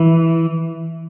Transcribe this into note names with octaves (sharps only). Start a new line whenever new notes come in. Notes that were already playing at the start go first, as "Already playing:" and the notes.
Already playing: E3